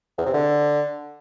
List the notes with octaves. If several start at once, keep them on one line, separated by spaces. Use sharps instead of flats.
E2
C3
D3